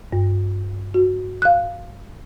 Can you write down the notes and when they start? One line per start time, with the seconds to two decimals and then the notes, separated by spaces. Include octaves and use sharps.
0.13 G2
0.94 F#4
1.42 F5 F#6